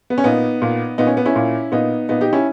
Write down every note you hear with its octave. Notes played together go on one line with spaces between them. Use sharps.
B3
C#4
A#2 B3 D#4
A#2
A#2 B3 D#4
C#4
B3
C#4 E4
A#2
A#2 B3 D#4
A#2 B3 D#4
D#4 G4
C#4 E4